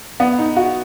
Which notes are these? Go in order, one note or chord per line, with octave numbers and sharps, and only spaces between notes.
B3
D#4
F#4